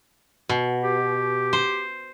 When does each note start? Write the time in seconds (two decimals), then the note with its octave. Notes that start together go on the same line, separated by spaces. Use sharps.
0.49 B2
0.84 G4
1.53 C5